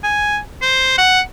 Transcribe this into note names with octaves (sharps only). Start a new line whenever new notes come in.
G#5
C5
F#5